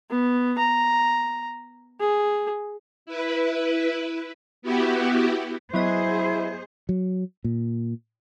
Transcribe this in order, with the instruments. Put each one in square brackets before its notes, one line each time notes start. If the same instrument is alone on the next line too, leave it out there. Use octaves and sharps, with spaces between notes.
[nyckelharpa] B3
A#5
G#4
[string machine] E4 B4
B3 E4 F#4 G4
[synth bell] F#3 B3 D#5 [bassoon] E4 [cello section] G#4 C5
[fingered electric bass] F#3
A#2